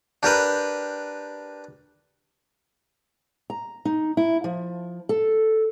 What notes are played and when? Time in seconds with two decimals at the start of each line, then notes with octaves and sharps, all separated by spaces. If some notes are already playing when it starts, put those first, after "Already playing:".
0.23 D4 G4 A#4 B4
3.50 A#5
3.85 D#4
4.17 E4
4.44 F3
5.09 A4